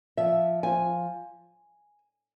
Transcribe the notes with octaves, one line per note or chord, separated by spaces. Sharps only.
F3 E5
F3 G#5